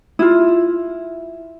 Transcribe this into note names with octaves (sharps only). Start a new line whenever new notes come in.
E4 F4